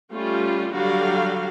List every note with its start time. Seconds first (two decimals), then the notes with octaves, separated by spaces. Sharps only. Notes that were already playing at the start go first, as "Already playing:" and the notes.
0.13 G3 A3 C#4 F4
0.74 D3 F#3 G3 F#4 F5